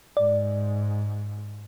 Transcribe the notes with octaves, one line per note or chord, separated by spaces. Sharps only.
G#2 D5